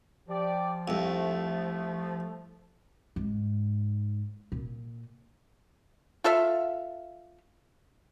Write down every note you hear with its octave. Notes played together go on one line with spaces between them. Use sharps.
F3 G4 D5
C2 F2 A3
G#2
A#2
F4 A4 E5 F5